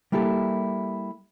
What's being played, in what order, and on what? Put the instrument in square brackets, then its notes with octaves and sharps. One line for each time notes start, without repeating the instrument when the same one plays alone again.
[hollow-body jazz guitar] G3 A#3 E4 G4 A4